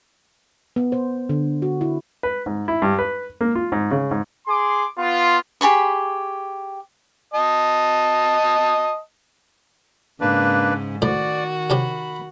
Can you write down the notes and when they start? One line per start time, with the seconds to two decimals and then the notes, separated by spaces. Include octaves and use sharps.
0.76 B3
0.92 C5
1.29 D3
1.62 F#4
1.81 E4
2.23 B4
2.46 G#2
2.68 E4
2.82 G2
2.99 B4
3.41 A#3
3.55 F4
3.72 G#2
3.91 C#3
4.11 G#2
4.47 G#4 C6 D6
4.98 B3 F4
5.61 G4 G#4 B5 C#6
7.34 D#5 A5 D#6
10.21 G#2 C#3 A#3 D4 B4
11.02 A2 D#3 F#4 C5 D5
11.70 C3 C#4 G4 B5